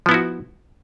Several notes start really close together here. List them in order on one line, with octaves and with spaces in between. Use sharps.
F3 B3 E4 F#4